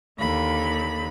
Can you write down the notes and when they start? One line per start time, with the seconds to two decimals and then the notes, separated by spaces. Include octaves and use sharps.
0.18 D#2 D3 B5